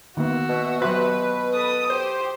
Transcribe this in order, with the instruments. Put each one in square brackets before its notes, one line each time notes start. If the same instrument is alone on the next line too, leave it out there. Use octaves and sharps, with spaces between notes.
[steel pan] D#3 A#3 B3 [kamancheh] F#4 E5
[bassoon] B2
[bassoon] B2 [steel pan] F#3 G4 C5 [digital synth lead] B4
[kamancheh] A4 D#6
[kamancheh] G4 [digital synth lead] C5